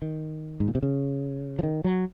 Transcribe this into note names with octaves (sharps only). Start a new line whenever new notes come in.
D#3
G#2
A#2
C3
C#3
F3
D#3
F#3